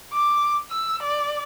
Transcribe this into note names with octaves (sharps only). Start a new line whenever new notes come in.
D6
E6
D5